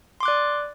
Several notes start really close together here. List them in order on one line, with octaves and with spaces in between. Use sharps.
C6 D6 F#6 D5